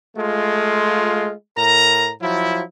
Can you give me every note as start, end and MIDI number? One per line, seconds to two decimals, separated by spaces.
0.17 1.32 56
0.17 1.32 57
0.17 1.32 65
1.56 2.11 45
1.56 2.11 70
1.56 2.11 82
2.22 2.62 53
2.22 2.62 54
2.22 2.62 64